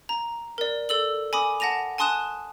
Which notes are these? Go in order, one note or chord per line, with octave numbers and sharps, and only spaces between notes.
A#5
A#4 D5
A4 D5 E6 F#7
G#5 B5 D6 D#6
F#5 A5 A#6 D#7 F7
G#5 A5 C6 D#6 F#6 E7